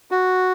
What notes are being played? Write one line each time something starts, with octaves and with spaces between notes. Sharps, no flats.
F#4